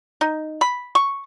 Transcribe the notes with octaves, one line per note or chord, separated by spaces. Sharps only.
D#4
B5
C#6